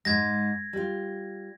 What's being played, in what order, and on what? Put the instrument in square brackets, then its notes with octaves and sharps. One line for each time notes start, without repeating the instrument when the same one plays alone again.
[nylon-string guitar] G#2 G#3 [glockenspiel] G#6 A#6
[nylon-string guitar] G3 F4